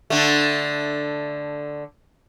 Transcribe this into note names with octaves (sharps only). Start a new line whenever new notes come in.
D3 A3